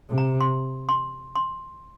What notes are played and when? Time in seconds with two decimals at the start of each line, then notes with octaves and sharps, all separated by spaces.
0.10 C3
0.18 A#5
0.41 C6
0.89 C6
1.36 C6